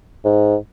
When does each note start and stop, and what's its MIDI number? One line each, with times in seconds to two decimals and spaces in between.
0.25 0.56 44